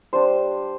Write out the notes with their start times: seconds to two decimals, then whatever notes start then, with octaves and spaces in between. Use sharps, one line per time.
0.13 G3 D4 C5